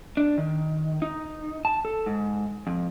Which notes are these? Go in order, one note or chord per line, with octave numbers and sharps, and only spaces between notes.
D4
D#3
D#4
A5
A4
G#2
F2